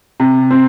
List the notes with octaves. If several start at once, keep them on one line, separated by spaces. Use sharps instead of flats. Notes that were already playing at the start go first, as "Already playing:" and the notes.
C3
C4